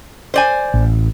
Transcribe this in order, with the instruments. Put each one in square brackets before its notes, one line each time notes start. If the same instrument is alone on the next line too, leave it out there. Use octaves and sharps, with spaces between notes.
[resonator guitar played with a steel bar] C5 D5 G#5
[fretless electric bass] A1